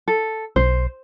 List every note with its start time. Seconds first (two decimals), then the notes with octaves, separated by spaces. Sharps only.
0.08 A4
0.56 B1 C5